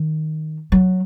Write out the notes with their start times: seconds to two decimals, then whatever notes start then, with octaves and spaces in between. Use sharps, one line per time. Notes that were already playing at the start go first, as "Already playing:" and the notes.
Already playing: D#3
0.72 F#3